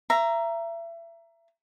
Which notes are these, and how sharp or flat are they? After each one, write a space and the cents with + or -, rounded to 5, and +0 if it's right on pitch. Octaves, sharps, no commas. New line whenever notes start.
E5 +30 A#5 +0